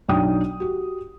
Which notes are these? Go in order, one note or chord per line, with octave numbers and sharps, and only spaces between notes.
B1 D4 D#4 G5 D#6
F#4 G4